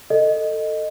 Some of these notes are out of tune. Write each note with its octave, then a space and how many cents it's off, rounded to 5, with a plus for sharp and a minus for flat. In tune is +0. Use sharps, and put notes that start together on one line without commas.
A4 +20 D#5 -10